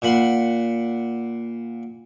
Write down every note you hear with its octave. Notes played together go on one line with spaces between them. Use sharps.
A#2 F#5 B5 C6